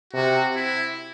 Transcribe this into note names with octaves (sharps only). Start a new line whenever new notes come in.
C3 F#4
E4